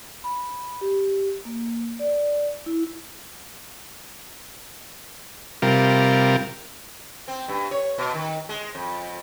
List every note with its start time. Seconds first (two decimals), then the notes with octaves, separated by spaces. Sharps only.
0.24 B5
0.81 G4
1.45 A#3
1.99 D5
2.66 E4
5.62 C3 G3 F4 A#4
7.28 C4
7.48 G2
7.71 C#5
7.98 B2
8.14 D#3
8.49 G#3
8.75 F2